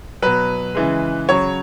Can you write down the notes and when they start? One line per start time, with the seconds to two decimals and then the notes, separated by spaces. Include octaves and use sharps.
0.22 B2 F#3 B4
0.75 C#3 E3 G#3
1.29 C#3 F#3 C#5